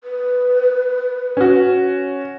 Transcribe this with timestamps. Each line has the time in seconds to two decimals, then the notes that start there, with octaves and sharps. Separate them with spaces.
0.04 B4
1.37 C#4 F#4